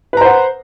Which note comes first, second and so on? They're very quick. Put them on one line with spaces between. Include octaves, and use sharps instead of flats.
B4 A#5 C5 F#5